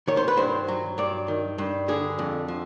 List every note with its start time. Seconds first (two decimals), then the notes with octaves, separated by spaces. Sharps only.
0.08 D#3 C#5
0.17 C5
0.28 B4
0.37 G2 C5
0.68 F#3
0.98 G2 D5
1.28 D#3
1.58 G2
1.88 D3 G#4
2.19 F2
2.48 F3